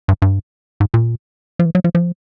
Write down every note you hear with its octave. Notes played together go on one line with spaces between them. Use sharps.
G2
G2
G#2
A#2
F3
E3
F#3
F3
F3